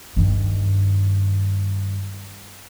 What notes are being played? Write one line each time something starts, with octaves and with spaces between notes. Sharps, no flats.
G2 D#3